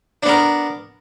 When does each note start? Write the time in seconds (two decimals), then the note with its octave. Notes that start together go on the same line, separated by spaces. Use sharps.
0.23 D4
0.26 B3
0.29 A#4